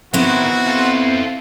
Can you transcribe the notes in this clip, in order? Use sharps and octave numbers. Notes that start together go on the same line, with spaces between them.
D#3 E3 B3 C4 E4 F#4
F4 A4